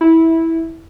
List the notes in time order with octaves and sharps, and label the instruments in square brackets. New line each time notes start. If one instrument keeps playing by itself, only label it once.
[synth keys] E4